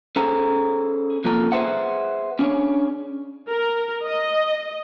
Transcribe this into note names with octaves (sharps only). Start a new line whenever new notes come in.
C#4 G#4 A4 C5 A#5
C3 F3 A#3 A4 A#4
G#4 A4 B4 C5 E5 F#5
C#4 D4 G#4 C#5
A#4
D#5